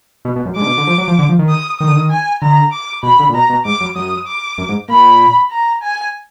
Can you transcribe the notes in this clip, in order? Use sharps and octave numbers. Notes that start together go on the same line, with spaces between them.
B2
B2
F#2
G#2 D6
D3
B2
D3
F3
F#3
F3
D3
F3
D#3
D#6
D#3 D#6
D3
D#3
G#5
D3 A#5
D6
B2 B5
D3
A#2
B2 A#5
B2
G#2 D6
F#2
F#2 D#6
D6
F#2
G#2
A#2 B5
A#5
G#5